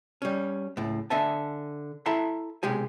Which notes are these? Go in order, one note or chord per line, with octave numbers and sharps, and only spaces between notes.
G3 C#4
C#2 A2
D3 D#5 E5 G#5 A5
E4 A4 E5 A5 A#5 C6
B1 C3 G#3 G4 G#5